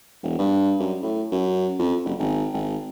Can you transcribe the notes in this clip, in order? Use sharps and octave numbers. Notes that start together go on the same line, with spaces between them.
E1
G2
F#2
A2
F#2
F2
F#1
G#1
G#1